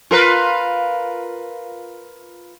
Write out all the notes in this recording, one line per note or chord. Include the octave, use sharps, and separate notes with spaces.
F4 A#4 B4